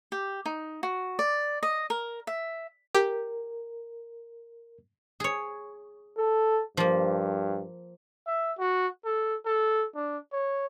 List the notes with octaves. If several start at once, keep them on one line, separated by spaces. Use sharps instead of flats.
G4
D#4
F#4
D5
D#5
A#4
E5
G4 A#4
G#4 C#5
A4
G2 F3 A#3
E5
F#4
A4
A4
D4
C#5